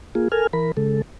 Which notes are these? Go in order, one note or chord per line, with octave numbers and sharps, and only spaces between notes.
A#3 F4 G#4
A4 A#4 G#5 F6
E3 A#4 B5
C#3 G#3 A4